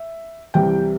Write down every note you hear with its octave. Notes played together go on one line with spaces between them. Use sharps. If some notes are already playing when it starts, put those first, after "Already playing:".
Already playing: E5
C2 C3 E3 G3 G5